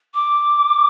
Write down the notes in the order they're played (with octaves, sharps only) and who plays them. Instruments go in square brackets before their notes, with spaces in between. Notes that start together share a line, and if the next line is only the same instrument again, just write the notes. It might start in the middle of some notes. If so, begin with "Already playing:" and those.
[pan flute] D6